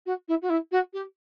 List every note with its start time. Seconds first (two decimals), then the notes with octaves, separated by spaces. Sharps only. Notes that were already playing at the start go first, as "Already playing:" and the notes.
0.06 F#4
0.28 E4
0.42 F#4
0.50 E4
0.72 F#4
0.94 G4